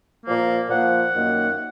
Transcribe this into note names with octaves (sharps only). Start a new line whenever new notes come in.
A#2 F3 A#3
A#2 F3 A#3 F#5
F#2 D#3 A#3